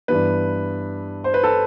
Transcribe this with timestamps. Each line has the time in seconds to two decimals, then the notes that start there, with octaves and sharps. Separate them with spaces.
0.08 G2 E3 G3 B3 B4
1.24 C5
1.34 B4
1.43 A4